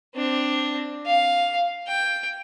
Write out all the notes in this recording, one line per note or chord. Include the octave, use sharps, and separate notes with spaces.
C4 D4
F5
G5